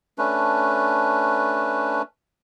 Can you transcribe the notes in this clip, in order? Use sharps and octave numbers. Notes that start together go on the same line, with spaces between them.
A3 C#4 D4 B4